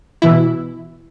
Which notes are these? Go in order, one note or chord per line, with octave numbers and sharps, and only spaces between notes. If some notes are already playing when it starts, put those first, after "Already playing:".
B2 E3 E4